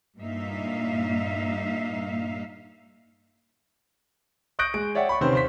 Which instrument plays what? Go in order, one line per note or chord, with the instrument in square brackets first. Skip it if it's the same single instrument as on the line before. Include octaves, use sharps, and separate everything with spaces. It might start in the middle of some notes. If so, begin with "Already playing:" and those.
[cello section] G2 A#2 A#3 D#4 E5 F5
[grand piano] C#6 D#6 F#6 G6 A#6 D7
G#3 D7
C#5 D5 E5 F#5 G5
B5 C#6
C3 D#3 C4 C#4 B4 C5
D#2 C5 B6